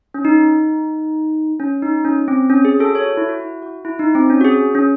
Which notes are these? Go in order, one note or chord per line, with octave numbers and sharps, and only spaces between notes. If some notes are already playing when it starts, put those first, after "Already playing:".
C#4
D#4
C#4
D#4
C#4
C4
C#4
G#4
F#4 A4
A4 C#5
F#4
E4
F#4
E4
F#4
E4
D#4
C4
C#4
F#4
G#4
C#4